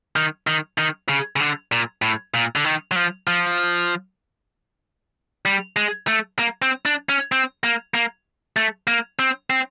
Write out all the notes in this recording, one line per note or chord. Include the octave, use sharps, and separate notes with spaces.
D#3
D#3
D#3
C#3
C#3
D3
A#2
A2
A#2
D3
D#3
F#3
F3
F3
G3
G#3
A3
A#3
C4
D4
C#4
C4
A#3
A#3
A3
A#3
C4
C4